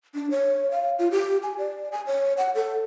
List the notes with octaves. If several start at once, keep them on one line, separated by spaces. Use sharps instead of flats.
D4
C#5
F5
F4
G4
G#5
D5
G#5
C#5
F#5
A4